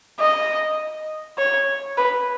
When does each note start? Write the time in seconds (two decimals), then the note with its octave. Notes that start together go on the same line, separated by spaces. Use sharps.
0.19 D#5
1.38 C#5
1.98 B4